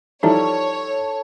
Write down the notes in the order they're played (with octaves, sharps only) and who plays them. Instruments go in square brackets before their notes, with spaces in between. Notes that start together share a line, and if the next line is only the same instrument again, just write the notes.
[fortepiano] F3 G3 E4 [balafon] D#4 [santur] A4 [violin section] C#5